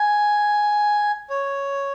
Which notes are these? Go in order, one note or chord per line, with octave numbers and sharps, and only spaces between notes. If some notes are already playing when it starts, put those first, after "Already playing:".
Already playing: G#5
C#5